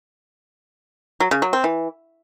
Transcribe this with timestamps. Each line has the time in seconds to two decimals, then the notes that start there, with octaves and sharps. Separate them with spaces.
1.20 F#3
1.31 C#3
1.42 F#3
1.53 C4
1.64 E3